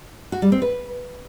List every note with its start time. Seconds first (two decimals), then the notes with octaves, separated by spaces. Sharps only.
0.32 F#4
0.42 G3
0.52 C4
0.62 B4